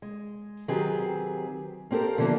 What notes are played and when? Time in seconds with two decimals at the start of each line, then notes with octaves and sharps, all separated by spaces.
0.02 G#3
0.68 D#3 F#3 C4 G4 G#4 B4
1.91 A#3 C4 G4 A4 A#4
2.18 D3 E3 F3 A#3 B3 D4